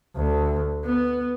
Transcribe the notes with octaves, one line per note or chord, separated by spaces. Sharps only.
D2
B3